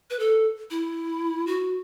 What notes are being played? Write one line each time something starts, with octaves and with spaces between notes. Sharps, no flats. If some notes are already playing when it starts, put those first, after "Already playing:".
B4
A4
E4
F#4